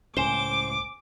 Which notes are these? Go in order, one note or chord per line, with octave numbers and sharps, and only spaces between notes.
C#2 A2 C#4 C5 G#5 D6 E7 G7